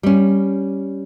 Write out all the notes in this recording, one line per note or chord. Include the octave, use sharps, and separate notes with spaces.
G3 C#4